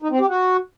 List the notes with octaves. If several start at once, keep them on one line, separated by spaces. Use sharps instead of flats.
D#4
C4
G4
F#4